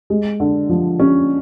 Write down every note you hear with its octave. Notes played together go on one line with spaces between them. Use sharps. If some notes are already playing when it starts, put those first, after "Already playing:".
G#3
D3
F3
C#4